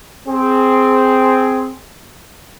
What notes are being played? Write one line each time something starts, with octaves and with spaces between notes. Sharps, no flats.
C4 G#4